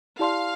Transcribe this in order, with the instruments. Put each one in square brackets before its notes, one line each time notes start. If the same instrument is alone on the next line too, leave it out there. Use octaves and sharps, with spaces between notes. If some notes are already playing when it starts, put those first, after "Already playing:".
[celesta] E4 G4 D5 A5 C6 [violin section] F5